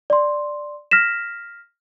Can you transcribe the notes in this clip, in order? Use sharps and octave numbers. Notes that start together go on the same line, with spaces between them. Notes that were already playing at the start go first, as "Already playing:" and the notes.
D5 C6
F6 A#6 B6 E7